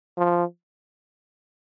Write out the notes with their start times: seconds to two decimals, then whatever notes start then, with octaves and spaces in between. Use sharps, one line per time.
0.18 F3